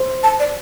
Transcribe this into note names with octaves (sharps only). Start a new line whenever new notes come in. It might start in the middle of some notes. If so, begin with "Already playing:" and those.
Already playing: C5
A5
D5